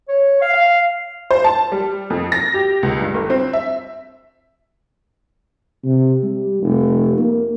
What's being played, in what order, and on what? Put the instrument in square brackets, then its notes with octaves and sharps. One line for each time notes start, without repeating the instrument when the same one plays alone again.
[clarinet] C#5
F5
F5
[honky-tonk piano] C5
A5
G3
F2
A#6
G4
C#2
G2
G1
C4
E5
[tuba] C3
G3
F1
A#3